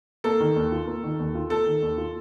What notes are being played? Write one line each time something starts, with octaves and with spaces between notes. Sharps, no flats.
A#3 A4
D#3
D#2
F4
A#3
D#3
D#2
F4
A#3 A4
D#3
D#2
F4